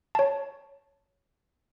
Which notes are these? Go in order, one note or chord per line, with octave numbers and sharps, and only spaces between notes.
C#5 A5